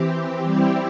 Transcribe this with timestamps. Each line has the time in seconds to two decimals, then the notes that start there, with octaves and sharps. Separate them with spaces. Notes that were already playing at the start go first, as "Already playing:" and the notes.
Already playing: E3 C4 G4
0.44 G3 C4 E4 G4